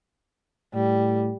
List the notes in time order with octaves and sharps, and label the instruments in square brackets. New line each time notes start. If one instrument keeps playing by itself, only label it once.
[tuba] A2 [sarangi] G3